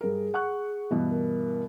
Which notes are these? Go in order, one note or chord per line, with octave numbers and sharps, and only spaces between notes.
G2 G#4 A#4
F#5 C#6 F#6
G2 B2 E3
A#4